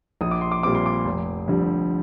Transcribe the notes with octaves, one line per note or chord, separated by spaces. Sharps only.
A#1 D#6
D6
C6
D6
A#2 G3 C4 D6
C6
D6
F1
F2 D3 G3